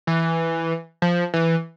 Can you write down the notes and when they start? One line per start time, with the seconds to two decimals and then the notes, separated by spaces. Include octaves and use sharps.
0.07 E3
1.02 F3
1.34 E3